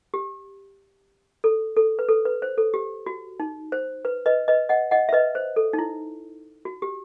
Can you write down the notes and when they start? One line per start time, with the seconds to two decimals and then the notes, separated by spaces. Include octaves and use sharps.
0.14 G4
1.44 A4
1.76 A4
1.99 B4
2.09 A4
2.25 B4
2.42 C5
2.58 A4
2.74 G4
3.06 F#4
3.40 D#4
3.72 C5
4.05 B4
4.26 B4 D#5
4.48 B4 D#5
4.69 D#5 F#5
4.91 D#5 F#5
5.09 E5
5.13 B4 D#5
5.35 C5
5.56 A4
5.73 D#4
5.79 E4
6.65 F#4
6.82 G4